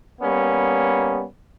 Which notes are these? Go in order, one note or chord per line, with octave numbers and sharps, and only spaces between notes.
G3 A#3 B3 C#4